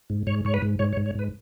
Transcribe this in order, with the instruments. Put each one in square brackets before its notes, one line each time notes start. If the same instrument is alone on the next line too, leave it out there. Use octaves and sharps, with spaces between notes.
[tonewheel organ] G#2
G#2 C#5
G#2 C#5
B4
G#2
G#2 C#5
C#5
G#2
C#5
G#2 B4